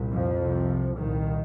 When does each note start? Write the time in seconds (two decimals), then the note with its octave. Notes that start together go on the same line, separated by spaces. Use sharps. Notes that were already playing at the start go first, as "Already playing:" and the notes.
Already playing: C2 A#2
0.11 F2 F3
0.40 C2 C3
0.97 C2 A#2 D#3